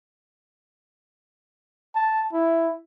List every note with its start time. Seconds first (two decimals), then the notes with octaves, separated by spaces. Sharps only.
1.95 A5
2.33 E4